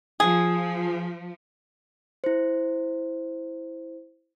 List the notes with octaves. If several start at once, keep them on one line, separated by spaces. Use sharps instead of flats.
F3 G#4
E4 C5